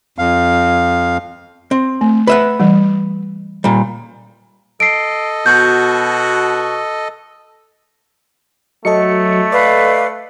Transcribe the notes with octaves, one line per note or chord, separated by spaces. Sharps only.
F2 F5
C4
A3
B4 E5 F#5
E3 G3
A#2 G3
A4 D#5 C7 D7
B2 F#4 G6
F#3 A3 A4 D#5 C#7
B4 D5 F5